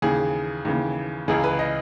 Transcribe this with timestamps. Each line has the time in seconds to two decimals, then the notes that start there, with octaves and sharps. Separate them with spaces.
0.02 D#2 C#3 E3 G#4
0.65 D#2 C#3 E3
1.28 C#2 C#3 E3 G#4
1.44 B4
1.59 D#5